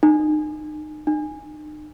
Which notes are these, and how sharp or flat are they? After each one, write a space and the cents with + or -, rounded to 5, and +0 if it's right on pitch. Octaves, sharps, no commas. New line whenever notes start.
D#4 -35
D#4 -40